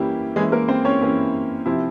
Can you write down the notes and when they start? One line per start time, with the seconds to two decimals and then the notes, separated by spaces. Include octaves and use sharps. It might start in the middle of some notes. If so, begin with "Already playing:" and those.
Already playing: E3 G3 A#3 C#4 E4 G4
0.36 E3 G#3 A#3 C#4 E4 G#4
0.52 A#3 A#4
0.68 C4 C5
0.85 C#4 C#5
1.01 E3 A#3 C#4 E4
1.66 C3 F3 C4 E4